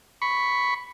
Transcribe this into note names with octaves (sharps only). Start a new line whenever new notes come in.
B5 C#6